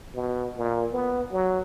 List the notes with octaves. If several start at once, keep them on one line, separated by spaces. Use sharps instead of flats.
B2
A#2
B3
F#3